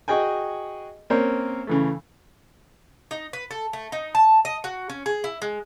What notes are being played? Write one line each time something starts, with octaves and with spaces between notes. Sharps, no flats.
F#4 G#4 D#5 G5 G#5
A#3 C4 C#4 C5 C#5
C#3 E3 A3
D#4
B4
A4
A3
D#4
A5
D#5
F#4
C#4
G#4
E4
G#3